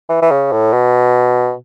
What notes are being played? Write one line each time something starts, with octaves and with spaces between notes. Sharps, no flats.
E3
E3
C#3
A2
B2